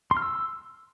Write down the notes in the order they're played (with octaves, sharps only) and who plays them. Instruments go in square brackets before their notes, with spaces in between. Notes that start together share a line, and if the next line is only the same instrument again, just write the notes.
[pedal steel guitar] C6
F6
E6